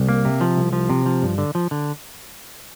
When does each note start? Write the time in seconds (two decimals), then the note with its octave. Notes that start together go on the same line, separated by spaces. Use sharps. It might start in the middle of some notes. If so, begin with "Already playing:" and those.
Already playing: C2
0.09 A#3
0.25 C3
0.41 F3
0.57 C2
0.73 F3
0.90 C3
1.06 F3
1.22 G2
1.38 D3
1.55 F3
1.71 D3